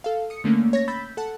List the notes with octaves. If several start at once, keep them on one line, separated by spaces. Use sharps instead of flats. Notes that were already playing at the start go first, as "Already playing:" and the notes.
A4 F5
D#6 C#7
D3 A3 A#3 C#4
C#5 A#6
B5 E6 G6 A6 B6
A4 F#5 A5